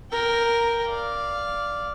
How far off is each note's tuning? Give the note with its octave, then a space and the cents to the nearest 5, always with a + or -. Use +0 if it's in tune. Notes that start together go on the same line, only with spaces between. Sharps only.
A#4 +0 G5 +0
D5 -5 F5 +0